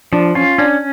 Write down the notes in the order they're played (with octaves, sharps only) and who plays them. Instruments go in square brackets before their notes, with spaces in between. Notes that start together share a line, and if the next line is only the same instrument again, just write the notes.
[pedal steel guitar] F3 [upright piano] D4
[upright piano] C#4 [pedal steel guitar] F4
[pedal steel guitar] C#4 [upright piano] D4